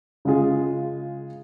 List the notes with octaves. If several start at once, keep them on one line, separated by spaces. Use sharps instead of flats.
C#3 G#3 F4 G#4